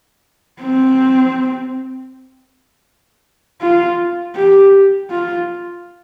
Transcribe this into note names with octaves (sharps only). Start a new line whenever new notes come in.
C4
F4
G4
F4